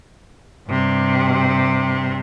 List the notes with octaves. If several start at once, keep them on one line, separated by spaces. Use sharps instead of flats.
G2 C3